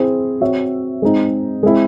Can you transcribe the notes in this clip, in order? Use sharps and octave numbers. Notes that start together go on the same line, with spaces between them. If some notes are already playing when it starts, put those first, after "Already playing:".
Already playing: C4 E4 G#4 C5
C4 F#4 C#5 E5
G#3 C4 D#4
G#3 C4 E4